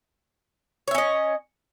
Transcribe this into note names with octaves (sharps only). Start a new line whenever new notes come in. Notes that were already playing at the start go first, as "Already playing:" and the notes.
C#4 C#5 D#5 E5